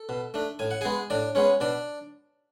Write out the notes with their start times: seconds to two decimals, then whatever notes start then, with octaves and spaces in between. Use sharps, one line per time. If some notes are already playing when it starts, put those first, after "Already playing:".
Already playing: A4
0.09 B2
0.34 A3 D4
0.59 A2 G#5
0.71 F#5
0.81 G#3 B3 G#4 G#5
1.10 A2 D4 D5
1.35 G#3 B3 C#4 C#5
1.60 B2 D4 D5